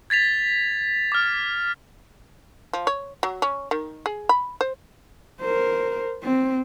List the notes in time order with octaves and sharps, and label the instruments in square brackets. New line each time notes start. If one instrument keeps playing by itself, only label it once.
[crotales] G#6 A6 B6 F7
D6 F6
[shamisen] F3
C#5
F#3
C#4
D#3
G#4
B5
C5
[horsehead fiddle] A#4 C5
C4